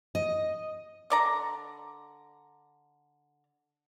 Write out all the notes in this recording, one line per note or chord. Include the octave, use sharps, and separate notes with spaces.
D#5
D3 D5 A#5